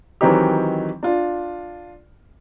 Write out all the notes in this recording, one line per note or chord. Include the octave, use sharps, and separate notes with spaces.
D#3 E3 F#3 C4 D#4 G4
D4 F4